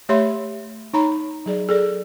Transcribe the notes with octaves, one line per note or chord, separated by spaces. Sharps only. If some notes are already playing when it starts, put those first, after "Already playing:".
A3 G4 C#5 E5 B5 C6
D#4 C#5 A#5 B5
F#3 G#4 D5
G#4 A4 D5